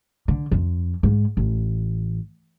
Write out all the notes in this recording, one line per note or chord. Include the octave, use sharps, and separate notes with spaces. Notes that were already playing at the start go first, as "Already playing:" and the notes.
D3
F2
G#2
A1